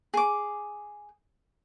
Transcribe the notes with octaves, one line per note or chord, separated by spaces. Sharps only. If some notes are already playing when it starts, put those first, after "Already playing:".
G#4 D6